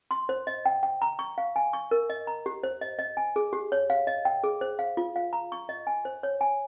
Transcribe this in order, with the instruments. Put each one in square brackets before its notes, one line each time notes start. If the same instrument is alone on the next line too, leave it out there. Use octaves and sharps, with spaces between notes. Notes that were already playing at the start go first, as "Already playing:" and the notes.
[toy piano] C6
C5
D#5
G5
G5
A#5
C#6
F5
G#5
C#6
A#4
D#5
A#5
G4
C5
D#5
D#5
G#5
G#4
G4
C#5
F5
D#5
G5
G#4
C5
F5
F4
F5
A#5
C#6
D#5
G#5
C5
C#5
G#5